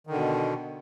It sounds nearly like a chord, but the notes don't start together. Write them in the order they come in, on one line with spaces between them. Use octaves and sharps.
D#3 D3 B2